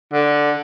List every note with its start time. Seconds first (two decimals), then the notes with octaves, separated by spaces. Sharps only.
0.13 D3